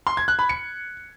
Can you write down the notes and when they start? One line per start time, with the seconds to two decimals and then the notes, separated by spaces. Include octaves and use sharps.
0.07 C6
0.17 G#6
0.28 F#6
0.39 B5
0.49 C#7